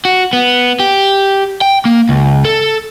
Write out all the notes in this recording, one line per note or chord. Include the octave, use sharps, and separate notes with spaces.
F#4
B3
G4
G5
A#3
C#2
A4